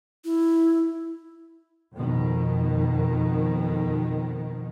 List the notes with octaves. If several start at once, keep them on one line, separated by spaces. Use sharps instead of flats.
E4
F2 B2 D#3